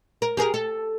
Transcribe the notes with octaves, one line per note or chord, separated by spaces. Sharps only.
A#4
G4 G#4 A#4
A4